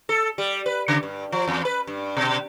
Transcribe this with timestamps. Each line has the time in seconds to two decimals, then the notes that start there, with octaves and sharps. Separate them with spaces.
0.09 A4
0.38 G3
0.66 B4
0.88 C#3
1.03 G2
1.32 F3
1.48 E2
1.65 B4
1.87 G2
2.17 B2